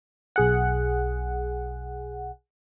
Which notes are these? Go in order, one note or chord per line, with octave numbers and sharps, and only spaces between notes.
B1 G#4 F#5